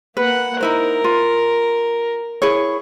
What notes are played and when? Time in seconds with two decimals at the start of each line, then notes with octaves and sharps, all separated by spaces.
0.17 A#3 B4 F#5
0.61 D#4 E4 A#4 C5
1.04 F4
2.42 E4 G#4 C#5